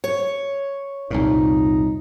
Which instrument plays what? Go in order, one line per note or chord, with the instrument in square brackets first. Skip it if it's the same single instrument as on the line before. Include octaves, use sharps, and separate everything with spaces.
[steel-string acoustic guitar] C#5
[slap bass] C2 F2 A#2 [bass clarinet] D#4